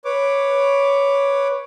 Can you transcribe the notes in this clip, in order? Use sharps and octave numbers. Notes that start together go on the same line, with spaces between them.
B4 C#5 D6